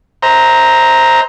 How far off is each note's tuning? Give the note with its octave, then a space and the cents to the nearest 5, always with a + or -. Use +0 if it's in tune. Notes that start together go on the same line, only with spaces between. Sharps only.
C5 +0 E5 -40 A#5 +0